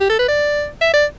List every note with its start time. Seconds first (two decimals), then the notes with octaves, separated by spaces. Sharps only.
0.01 G4
0.09 A4
0.19 B4
0.28 D5
0.81 E5
0.94 D5